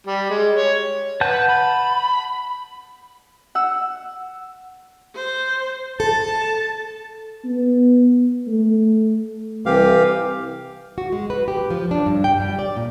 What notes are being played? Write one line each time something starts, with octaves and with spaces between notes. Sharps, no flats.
G3
G#3
C#5
B4 F#5 A5 G6
B5
F#5 E6
C5
A4 A5
B3
A3
C2 E3 G4 F5
F#4
G#3
B4
G4
F3
D4
G2
G5
G3
D5
A#2